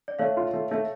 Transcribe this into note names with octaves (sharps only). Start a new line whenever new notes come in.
D5
A3 C#5 F5
F4
A3
A3